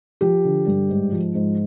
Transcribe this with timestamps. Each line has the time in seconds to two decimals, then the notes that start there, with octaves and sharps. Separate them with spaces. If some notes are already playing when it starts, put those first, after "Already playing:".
0.21 F3 G4
0.44 D3
0.67 G2
0.89 G#2
1.12 F3
1.35 G#2